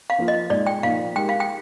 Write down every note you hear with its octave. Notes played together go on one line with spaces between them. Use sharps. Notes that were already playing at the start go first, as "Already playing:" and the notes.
F5
F3 A#3 F4
D#5
A#2 G#3 D#4 D5
G5
A#2 F3 A#3 D#4 F5
G#3 D#4 G4 A#4 G5
F5
G5